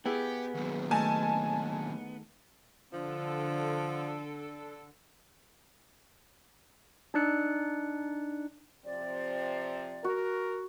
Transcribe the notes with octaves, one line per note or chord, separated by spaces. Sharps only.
B3 E4 G4 G#4
D#2 F#3
D#3 A3 G#5 A5
D3 F3 A4
D4 D#4 D5 F#6 C#7
C3 F3 C4 D5
F#4 A#4